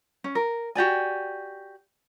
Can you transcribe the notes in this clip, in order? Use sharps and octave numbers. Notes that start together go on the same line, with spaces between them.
C#4
A#4
F#4 G4 D5 G#5